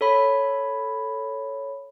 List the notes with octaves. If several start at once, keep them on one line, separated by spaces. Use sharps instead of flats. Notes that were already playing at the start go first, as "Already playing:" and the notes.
A4 C#5 B5